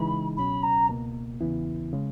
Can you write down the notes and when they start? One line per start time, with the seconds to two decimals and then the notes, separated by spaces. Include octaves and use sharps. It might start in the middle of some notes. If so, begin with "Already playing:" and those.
Already playing: C#3 E3 G#3 D#4 B5
0.37 C#2 B2 F#3 C#4 B5
0.63 A#5
0.89 C#2 B2 A#3
1.41 E2 C#3 E3 B3 E4
1.93 C#3 G#3